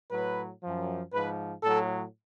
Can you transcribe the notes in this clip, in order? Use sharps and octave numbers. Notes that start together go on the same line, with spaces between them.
A2 F#3 B4
F#2 F3
G#2 F3 B4
A2 F#3 A4